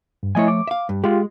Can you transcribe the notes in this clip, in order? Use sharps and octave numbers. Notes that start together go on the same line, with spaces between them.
G2
F3 A3 E4 C#5 D#5 G#5
D6
E5 F5
G2
G#3 F4 G4